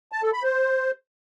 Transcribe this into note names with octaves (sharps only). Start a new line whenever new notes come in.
A5
A4
B5
C5